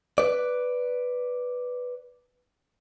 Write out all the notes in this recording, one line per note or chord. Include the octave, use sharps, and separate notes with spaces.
B4 D5